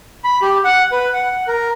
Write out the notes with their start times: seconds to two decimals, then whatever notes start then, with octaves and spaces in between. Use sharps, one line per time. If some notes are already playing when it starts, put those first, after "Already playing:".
0.24 B5
0.42 G4
0.65 F#5
0.92 B4
1.13 F#5
1.48 A#4